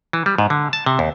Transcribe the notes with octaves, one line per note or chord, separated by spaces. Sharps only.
E3
G3
G#2
D3
A5
C3
D#2